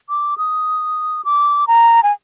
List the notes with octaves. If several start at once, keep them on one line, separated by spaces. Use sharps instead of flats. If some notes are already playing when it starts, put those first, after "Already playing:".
D6
D#6
D6
A#5
G#5